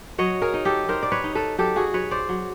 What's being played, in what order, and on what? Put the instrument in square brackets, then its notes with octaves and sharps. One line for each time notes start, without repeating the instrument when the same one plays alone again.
[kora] F#3 C#5 D#5
G#4 A#4
D#4
G4 A4
D#4 A#4 C5
D5
B4 C#5
D#4
A4 B4
F#3 G4 A4
F#4 G#4
F#3 B4 C#5
C5 D5
F#3